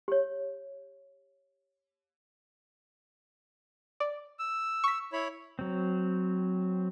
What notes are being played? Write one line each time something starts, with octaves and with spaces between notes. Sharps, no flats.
G4 C#5
D5
E6
C#6 B6
E4 C#5 B5
F#3 C4